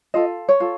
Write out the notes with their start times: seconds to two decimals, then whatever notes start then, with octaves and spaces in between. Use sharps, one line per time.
0.14 F4 A4 D#5
0.49 C#5
0.60 F4 A4